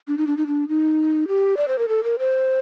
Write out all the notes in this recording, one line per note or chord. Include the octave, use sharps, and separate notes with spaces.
D4
D#4
D4
D#4
D4
D#4
G4
D5
C5
A#4
A4
A#4
C5